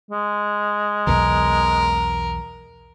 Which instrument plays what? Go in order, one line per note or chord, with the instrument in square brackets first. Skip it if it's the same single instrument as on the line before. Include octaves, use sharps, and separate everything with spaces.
[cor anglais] G#3
[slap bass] B1 E2 E3 [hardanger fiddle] A#4